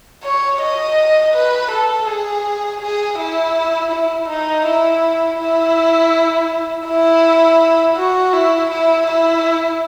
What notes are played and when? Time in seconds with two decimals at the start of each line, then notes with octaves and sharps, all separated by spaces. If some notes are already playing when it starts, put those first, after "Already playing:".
0.24 C#5
0.61 D#5
1.34 B4
1.71 A4
2.07 G#4
2.81 G#4
3.19 E4
3.91 E4
4.29 D#4
4.65 E4
5.39 E4
6.86 E4
7.96 F#4
8.33 E4
8.70 E4
9.07 E4